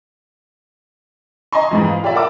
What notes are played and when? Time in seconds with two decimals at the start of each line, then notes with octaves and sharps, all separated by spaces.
1.52 D#5 G#5 A#5 C6 C#6
1.71 F2 G#2 E3
1.88 F5
2.03 F4 G4 C#5 D5 E5
2.15 A#4 F#5 A5 D6 E6